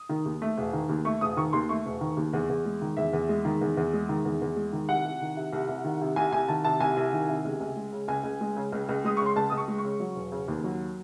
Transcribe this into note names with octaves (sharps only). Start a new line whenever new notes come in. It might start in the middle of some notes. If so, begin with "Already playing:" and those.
Already playing: D#6
D#3
D#2
A3
E1
D#3
D#2
A3 C#6
E1 D#6
D#3 C#6
D#2 C6
A3 C#6
E1
D#3
D#2
E2
E2
G#3
D#3
E2 E5
E2
G#3
D#3
E2
E2
G#3
D#3
E2
E2
G#3
D#3
C2 F#5
C2
D#3
C3
C2
C2
D#3
C3
C2 G#5
C2 G#5
D#3 A5
C3 A5
C2 G#5
C2
D#3
C3
C#2
C#2
G#3
C#3
C#2 G#5
C#2
G#3
C#3
C#2
C#2
G#3 D#6
C#3 C#6
C6
C#2 A5
C#2 D#6
C#6
G#3
C#6
C#3
F#3
E1
C#3
D#2
F#3